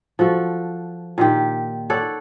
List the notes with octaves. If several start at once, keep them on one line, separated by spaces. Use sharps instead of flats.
F3 F#4 A4
A#2 D#3 G4
A4 C#5 D5 F#5